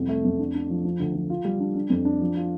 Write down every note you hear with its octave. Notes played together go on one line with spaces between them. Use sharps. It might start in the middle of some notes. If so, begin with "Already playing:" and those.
Already playing: C2 F2
A3
F2
D4
D4
F3
F3
D2
F3
F4
G3
D4
D4
F2
D4
F3
F4